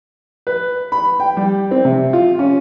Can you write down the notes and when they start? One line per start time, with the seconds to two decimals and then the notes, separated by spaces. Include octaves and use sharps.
0.47 B4
0.92 B5
1.20 G5
1.37 G3
1.71 C4
1.85 C3
2.13 F4
2.39 C#4